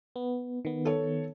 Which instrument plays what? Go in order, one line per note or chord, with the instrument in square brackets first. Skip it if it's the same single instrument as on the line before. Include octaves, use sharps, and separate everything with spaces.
[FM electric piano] B3
D#3 B3
[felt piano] A4 C#5